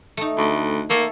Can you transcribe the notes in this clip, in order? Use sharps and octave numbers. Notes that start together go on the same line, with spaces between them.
A3 D#4
D2
A#3 A4 C#5 E5